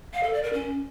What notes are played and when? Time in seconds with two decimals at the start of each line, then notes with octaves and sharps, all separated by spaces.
0.13 F5
0.23 A4
0.33 D5
0.43 A#4
0.53 C#4